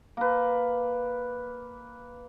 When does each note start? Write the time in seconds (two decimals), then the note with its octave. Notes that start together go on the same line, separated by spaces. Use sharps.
0.17 A#3 B4